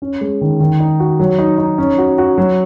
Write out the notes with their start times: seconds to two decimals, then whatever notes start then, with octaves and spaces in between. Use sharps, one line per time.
0.02 C#4
0.21 G#3
0.41 D#3
0.60 D#3
0.80 D#4
1.00 F#4
1.20 F#3
1.39 D#4
1.58 D#4
1.78 C#4
1.98 F#4
2.18 F#4
2.38 F#3